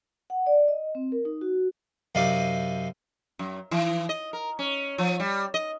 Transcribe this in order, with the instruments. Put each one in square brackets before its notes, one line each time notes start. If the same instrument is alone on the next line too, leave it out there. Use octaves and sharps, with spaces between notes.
[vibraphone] F#5
D5
D#5
C4
A#4
D#4
F#4
[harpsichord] F#2 C3 D#4 D5 F5 D6
[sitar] F#2
E3
D#5
A#4
C#4
F3
G3
D#5